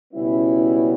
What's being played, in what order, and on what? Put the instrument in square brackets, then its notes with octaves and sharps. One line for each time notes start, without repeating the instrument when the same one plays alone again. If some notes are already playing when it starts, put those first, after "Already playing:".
[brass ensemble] C#2 B2 G3 B3 C#4 E4